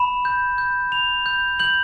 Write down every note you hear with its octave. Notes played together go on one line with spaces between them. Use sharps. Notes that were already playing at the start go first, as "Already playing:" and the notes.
Already playing: B5 E7
G6
G6
B5 F7
G6
G6 F#7